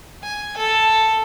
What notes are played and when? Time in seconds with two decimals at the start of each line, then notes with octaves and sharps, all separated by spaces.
0.23 G#5
0.57 A4